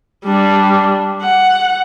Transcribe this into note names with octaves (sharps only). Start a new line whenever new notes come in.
G3 D4
F#5